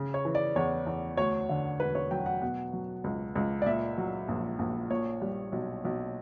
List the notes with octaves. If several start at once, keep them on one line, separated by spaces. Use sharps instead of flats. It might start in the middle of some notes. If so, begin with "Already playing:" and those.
Already playing: C#3
C#5
E3
D5
E2 C#5
E2
D2 C#5
D3
E1 B4
C#5
F#3 G5
F#5
B2 F#5
F#3
C#2
C#2
D5
A#2 E5
F#3
A#1
A#1
A#2 C#5
G3
B1
B1